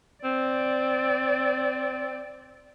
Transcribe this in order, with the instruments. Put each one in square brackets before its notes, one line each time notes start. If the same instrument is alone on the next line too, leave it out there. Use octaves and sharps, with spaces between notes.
[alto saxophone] C4 [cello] D5